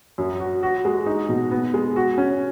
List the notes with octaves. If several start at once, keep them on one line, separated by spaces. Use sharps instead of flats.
F#2
F#4
F#4
G#3
D#4
B2
B3
G#3
F#4
C#4